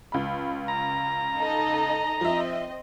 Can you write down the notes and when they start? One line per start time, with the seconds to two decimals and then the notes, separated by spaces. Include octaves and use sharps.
0.12 C#2 B5
0.68 A#5
1.38 D#4 A4 D#5
2.21 F3 C4 D#5 E5